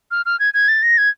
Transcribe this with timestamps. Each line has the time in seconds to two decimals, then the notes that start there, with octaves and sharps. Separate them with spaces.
0.11 F6
0.26 F6
0.40 G#6
0.54 G#6
0.68 A6
0.83 A#6
0.98 G#6